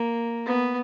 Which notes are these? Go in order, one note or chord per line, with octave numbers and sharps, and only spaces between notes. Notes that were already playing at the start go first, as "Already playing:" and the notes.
Already playing: A#3
B3